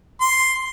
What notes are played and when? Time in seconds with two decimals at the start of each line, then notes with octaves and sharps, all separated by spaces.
0.21 C6